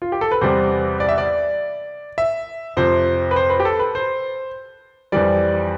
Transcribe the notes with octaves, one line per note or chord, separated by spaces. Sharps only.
F4
G4
A4
B4
E2 C3 G3 C5
D5
E5
D5
E5
F2 C3 F3 C5
B4
C5
B4
G4
A4
B4
C5
F2 E3 G3 D5